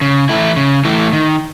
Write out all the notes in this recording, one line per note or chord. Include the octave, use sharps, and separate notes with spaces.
C#3
E3 A3 E4
C#3
E3 A3 E4
D#3